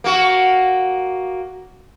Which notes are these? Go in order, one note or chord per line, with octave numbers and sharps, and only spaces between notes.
A#3 F#4